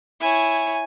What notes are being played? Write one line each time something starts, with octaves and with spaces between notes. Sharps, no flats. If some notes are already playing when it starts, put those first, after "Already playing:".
E4 C#5 G#5